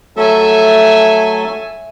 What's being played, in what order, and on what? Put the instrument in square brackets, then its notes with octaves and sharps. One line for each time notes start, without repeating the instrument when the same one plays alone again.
[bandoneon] F#3 A3 A4 [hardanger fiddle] E5 G#5